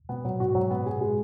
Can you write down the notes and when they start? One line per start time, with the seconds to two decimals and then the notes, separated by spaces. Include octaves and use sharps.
0.09 B2 B3
0.25 A#2 F#3
0.40 G#2 F#4
0.55 F#2 F#3
0.70 B3
0.86 G#4
1.01 G#3